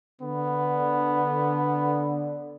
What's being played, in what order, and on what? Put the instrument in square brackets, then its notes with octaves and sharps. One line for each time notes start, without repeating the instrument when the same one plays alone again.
[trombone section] D3 [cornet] B3